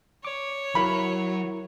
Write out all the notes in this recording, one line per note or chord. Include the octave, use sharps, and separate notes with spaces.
C#5 D6
F#3 E4 A#4 B5